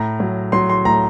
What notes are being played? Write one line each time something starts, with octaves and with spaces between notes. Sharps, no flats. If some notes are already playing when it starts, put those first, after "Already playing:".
Already playing: A2 A#5
F#3
F#3 C6
C6
A2 A#5